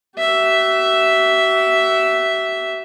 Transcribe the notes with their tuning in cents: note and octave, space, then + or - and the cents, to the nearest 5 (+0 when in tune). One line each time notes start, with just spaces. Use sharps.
F#4 +45 E5 +0